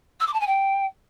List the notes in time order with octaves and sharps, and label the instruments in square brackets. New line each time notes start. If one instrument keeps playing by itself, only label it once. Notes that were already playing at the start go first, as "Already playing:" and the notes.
[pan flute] E6
D6
A5
G#5
G5